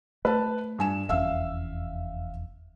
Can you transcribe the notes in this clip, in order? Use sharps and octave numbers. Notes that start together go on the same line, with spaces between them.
A3 B4 A5
G2 G#5 E7
F1 E2 C#4 E5 F5 E6